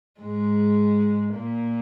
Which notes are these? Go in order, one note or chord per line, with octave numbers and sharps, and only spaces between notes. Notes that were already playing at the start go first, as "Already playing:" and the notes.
G#2 G#3
A#2 A#3